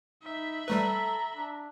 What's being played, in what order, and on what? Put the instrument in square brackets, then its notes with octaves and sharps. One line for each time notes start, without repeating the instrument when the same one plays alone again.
[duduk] D#4 [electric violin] E5 B5
[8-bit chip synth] G3 A3 B4 [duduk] A4 [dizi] A#5
[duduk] D4